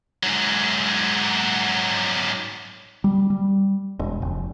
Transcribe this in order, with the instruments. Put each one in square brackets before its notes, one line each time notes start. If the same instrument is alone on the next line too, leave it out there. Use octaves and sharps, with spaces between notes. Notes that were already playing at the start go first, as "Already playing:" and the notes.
[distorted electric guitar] G#2 F#3
[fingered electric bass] G3
G3
E1
F1